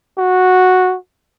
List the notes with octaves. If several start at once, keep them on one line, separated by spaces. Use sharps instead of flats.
F#4